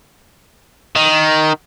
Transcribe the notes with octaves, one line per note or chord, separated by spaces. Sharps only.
D#3